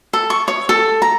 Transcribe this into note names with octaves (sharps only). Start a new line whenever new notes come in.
A4
C#6
C#5
A4
A#5